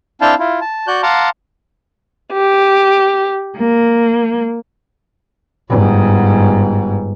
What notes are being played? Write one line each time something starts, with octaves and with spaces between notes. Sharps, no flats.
C4 D4 E4 F5 G5 A5
E4 F4
A5
F#4 D5 F#6 G6
F5 F#5 A5 A#5 C6 D6
G4
A#3
G1 G#2